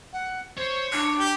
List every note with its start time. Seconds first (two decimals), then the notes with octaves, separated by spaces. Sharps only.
0.13 F#5
0.57 C5 C#5
0.92 D4 D6
1.18 G4